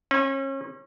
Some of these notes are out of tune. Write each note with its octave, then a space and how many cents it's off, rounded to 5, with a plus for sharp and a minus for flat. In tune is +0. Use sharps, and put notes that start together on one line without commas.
C#4 -35